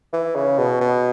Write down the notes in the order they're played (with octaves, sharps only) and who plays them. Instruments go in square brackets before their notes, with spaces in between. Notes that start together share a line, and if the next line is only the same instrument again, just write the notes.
[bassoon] E3
C#3
B2
B2